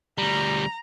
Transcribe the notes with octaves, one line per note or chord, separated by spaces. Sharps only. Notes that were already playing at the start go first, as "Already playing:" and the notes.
D2 G3 A#5